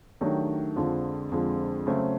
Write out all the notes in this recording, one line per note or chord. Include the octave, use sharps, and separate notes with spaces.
D#3 F#3 A3 D4 G4
F2 D3 F3 G#3
F2 D3 F3 G#3
C#3 F#3 A3 C4